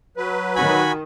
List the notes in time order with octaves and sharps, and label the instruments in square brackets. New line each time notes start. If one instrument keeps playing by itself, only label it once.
[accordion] F#3 B4
[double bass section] D#3 [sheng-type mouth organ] F#4 G#5 B5